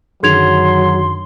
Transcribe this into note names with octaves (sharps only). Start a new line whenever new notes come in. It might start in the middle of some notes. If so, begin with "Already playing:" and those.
F#2 D3 D#3 F#3 G#4 C6 G#6 F7